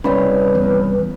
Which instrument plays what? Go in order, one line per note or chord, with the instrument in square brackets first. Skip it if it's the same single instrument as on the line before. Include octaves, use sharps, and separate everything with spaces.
[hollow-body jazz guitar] C2 C#3 [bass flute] B4 [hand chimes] C#5 B5
[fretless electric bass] E2